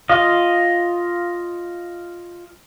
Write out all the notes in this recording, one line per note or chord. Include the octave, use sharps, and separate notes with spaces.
F4 D#5 F5